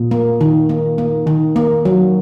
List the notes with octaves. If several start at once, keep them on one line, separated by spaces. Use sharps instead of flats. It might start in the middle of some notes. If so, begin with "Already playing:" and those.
Already playing: A#2
A#3
D#3
A#3
A#3
D#3
A#3
F#3